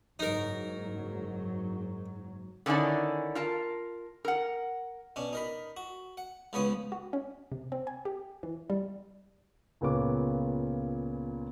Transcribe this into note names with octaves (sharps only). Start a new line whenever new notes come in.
F#1 G#2 F#3 D#4 A#4
D3 D#3 C#4 E4 D5 A5
F4 A#4 A5
A#4 F#5
B2 C#4 D4
D#4 A#4 B5
F#4
F#5
C#2 F3 B3 B4 C#5 D#6
F#4
C#4
C3
C4
G#5
G4
E3
G3
C#2 A#2 B3 C#4 D6